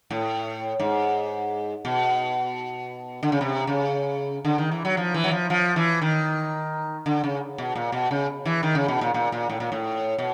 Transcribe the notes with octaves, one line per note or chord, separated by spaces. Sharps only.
A2
G#2
B2
D3
C#3
C3
C#3
D3
D#3
E3
F#3
F3
E3
F#3
F3
F3
E3
D#3
D3
C#3
B2
A#2
B2
C#3
E3
D#3
C#3
B2
A#2
A#2
A#2
A2
A#2
A2
B2